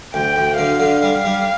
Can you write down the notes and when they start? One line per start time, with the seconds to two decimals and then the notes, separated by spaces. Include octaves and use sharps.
0.14 D2 G5
0.36 D2
0.58 D3 F5
0.80 D3
1.02 G3
1.25 G3